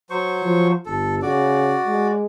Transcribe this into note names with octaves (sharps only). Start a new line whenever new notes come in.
F#3 C5 C#6
F3
G1 A4
C#3 F#4 D5
G#3